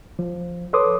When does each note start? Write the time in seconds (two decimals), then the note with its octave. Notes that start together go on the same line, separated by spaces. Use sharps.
0.19 F3
0.73 A4 B4 C#5 C6 D6 D#6